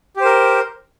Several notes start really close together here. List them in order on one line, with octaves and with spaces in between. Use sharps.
G4 C5 A#4